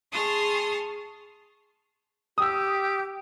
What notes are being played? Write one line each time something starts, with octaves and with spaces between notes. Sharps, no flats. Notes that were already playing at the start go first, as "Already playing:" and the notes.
G#4 A5 C6 C#6 D#6 F6
G4 D#6 E6